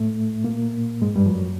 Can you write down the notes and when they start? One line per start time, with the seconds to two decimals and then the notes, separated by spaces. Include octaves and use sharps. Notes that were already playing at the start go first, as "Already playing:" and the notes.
Already playing: A2 A3
0.44 A#2 A#3
1.02 G#2 G#3
1.16 G2 G3
1.26 F3
1.30 F#2 F#3